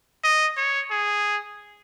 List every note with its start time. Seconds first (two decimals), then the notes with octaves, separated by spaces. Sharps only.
0.24 D#5
0.57 C#5
0.90 G#4